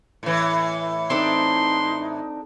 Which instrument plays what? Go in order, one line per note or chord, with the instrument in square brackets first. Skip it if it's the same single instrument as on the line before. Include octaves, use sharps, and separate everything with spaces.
[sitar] A2 E3
[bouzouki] C4 D4 A4 [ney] D#4 [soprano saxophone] C6